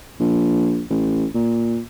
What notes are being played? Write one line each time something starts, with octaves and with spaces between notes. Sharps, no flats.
A#1
A1
A#2